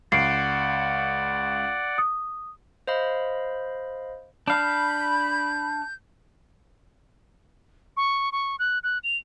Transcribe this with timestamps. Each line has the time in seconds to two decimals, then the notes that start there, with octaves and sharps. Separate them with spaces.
0.12 C#2 D5 F#5 C7 D7
1.98 D#6
2.87 C5 D#5 F5 B5
4.48 D4 F5 B5 G6
7.97 C#6
8.32 C#6
8.59 F#6
8.83 F#6
9.04 F7